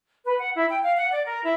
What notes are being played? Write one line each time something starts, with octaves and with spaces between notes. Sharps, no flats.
B4
F#5
E4
G5
F5
F#5
D5
A#4
E4